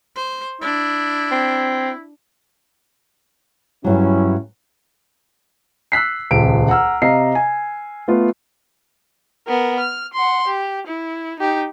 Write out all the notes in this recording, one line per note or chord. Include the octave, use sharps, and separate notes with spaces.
C5
D4 E4
C4
G2 F#3 C#4 E4
E6 F#6 B6 C7
D#1 C#2 D7
F#5 A#5 E6 F6
C3 D#5 F5 A#5 C7
G#5
A3 B3 F4
B3 A#4
F6
F#5 C6
G4
E4
D#4 G4